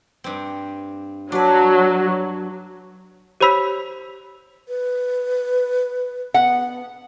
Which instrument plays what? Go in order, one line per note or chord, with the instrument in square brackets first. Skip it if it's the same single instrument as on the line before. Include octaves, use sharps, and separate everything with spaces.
[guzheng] G2 C4
[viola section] F#3 [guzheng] D4 B4
[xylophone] G4 C5 C#5 B5 E6 B6
[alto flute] B4
[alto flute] B3 [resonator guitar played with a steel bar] F#5